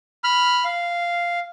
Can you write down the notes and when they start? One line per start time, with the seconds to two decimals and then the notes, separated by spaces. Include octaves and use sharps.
0.24 B5 F6
0.64 F5